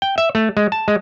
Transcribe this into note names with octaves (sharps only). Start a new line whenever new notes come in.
G5
E5
A3
G#3
A5
G#3